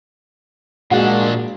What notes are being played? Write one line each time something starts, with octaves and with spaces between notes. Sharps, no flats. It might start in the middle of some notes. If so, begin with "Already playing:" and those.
A#2 G#3 A#3 D4 F#4